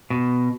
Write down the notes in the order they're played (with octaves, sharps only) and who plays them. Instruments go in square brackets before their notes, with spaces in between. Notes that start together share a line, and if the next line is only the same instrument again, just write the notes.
[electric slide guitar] B2